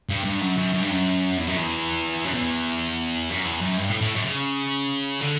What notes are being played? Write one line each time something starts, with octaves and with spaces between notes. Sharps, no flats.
G2
G2
F#2
F#2
F#2
G2
F#2
E2
F#2
E2
F#2
E2
F#2
E2
F#2
G2
A2
A2
F#2
C#3
D3